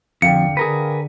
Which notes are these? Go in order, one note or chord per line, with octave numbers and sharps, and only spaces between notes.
F2 D3 F5 G5 C#7
D3 G#4 A#4 B4